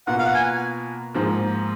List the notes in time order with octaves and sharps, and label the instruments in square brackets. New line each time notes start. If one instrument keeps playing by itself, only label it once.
[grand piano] B2 A#3 F4 [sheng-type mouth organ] F#5
[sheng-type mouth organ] F5
F#5
G#5
[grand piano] G#2 F3 A#3